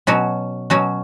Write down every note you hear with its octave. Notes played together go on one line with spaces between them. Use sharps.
B2 F#3 C#4 F#4
B2 F#3 C#4 F#4